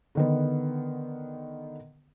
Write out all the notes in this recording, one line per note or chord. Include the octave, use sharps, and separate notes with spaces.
D3 D#3 B3